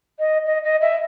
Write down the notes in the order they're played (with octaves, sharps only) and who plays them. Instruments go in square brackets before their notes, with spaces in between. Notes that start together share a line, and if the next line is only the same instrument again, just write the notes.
[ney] D#5
D#5
D#5
E5